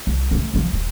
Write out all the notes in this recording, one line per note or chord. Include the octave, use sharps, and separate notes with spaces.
C2
G#3 A3
E2 F3
D#1